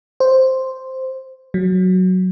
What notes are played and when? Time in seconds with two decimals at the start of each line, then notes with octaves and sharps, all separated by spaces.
0.20 C5
1.54 F#3